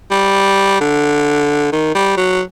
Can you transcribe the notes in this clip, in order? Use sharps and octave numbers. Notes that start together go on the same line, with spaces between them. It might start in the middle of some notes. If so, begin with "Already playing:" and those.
G3
D3
D#3
G3
F#3